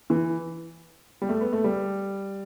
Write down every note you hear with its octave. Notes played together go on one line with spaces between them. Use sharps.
E3
G3
A3
B3
A3
G3